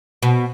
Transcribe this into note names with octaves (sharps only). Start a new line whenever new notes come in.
B2